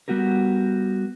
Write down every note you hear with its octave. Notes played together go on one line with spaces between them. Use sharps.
G3 B3 F#4 G4 A#4